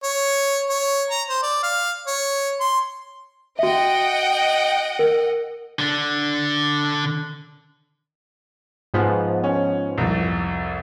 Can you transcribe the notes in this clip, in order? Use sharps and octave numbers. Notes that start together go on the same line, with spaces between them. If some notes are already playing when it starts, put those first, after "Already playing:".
C#5
C#5
A#5
C5
D5
F5
C#5
C6
F#4 D#5 E5 F#5 G5
A#4
D3 D4
G#2 F3 B3
C#4
C2 F2